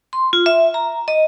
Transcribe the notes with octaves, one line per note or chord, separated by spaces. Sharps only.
C6
F4
E5
A#5
D#5